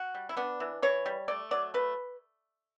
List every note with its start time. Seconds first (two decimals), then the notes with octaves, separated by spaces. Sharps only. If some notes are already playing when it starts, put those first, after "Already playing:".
Already playing: F#4
0.15 G3
0.29 E4
0.37 B3 D4
0.60 E3
0.82 E3 C#5
1.06 G3
1.28 A3 D5
1.51 F#3 D5
1.74 A3 B4